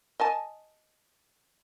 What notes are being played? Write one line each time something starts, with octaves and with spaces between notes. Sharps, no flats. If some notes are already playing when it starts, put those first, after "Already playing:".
D#5 G#5 A5